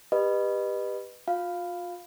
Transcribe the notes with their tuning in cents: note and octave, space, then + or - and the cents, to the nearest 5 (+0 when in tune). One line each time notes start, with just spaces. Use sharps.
G4 +15 B4 +0 D#5 -25
F4 +35 F5 +0